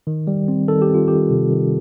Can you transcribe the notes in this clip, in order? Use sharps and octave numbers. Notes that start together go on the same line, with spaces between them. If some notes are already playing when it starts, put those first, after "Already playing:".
D#3
G3
C4
D#3 A4
G4
C4
F4
D#3 G4
C3
D#3